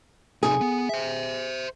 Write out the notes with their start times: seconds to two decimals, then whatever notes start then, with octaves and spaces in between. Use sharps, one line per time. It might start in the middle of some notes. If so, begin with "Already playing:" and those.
0.43 C3 D#4 G#4
0.61 B3
0.89 C5 E5